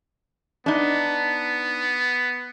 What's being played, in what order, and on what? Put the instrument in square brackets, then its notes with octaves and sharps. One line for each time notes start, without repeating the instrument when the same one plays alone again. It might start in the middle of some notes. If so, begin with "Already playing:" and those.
[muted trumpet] B3 [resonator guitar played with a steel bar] D4 D#4